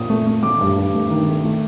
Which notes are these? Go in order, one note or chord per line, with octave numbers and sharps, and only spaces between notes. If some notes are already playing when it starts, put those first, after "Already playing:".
Already playing: A#2 D#6
A3
A3
A3 D6
G2
G2
A3
D#3
A3
A3